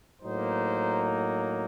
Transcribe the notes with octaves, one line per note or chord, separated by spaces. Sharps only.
A2 F#3 A#3 D#4 C5